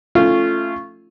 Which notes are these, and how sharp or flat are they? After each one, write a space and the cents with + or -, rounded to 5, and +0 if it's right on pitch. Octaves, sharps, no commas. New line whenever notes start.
A3 +0 C#4 -10 F4 -15